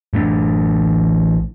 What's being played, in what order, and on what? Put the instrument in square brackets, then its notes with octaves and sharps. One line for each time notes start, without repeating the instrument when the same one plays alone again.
[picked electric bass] A1 A3 B3 D4